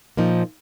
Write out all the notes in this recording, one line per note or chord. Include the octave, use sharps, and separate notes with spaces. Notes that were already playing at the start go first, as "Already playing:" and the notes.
A#2 F3 A#3 D#4